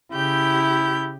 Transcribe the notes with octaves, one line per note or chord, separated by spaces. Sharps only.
C#3 E4 G4 G6